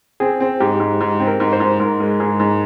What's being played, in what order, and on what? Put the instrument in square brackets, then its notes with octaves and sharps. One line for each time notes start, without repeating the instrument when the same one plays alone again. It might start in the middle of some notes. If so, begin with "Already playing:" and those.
[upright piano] C4 [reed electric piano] G#4
[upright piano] C4
[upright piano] G#2 [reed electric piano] G4
[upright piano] G#2
G#2
C4
[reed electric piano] A#4
[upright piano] G#2
[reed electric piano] C5
[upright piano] G#2
[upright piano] G#2 [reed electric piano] A#4
[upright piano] G#3
[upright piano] G#2 [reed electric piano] G#4
[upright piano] G#2